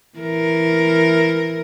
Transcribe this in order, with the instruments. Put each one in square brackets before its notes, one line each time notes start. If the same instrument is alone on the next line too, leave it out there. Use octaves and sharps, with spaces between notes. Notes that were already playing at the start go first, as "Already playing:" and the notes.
[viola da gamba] E3 A#4